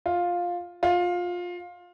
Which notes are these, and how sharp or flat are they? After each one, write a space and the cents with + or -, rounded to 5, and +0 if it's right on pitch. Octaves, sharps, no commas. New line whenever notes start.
F4 +10
F4 +20